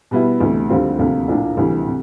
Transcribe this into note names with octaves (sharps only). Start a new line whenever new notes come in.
B2 G3 B3 E4
D2 C3 E3 A3
D#2 D3 G3 C4 F4
D2 C3 F3 A#3
A#1 A2 F3 A#3 D4
D2 C3 E3 G3
C3